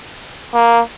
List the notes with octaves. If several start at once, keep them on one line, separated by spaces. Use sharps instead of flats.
A#3